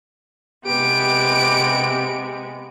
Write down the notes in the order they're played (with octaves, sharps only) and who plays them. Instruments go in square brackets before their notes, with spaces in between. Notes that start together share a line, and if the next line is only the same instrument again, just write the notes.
[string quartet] C3 G#3 B3 [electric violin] G4 D7